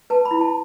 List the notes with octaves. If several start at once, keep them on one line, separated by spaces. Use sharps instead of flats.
B4 A5
B5
E4
A5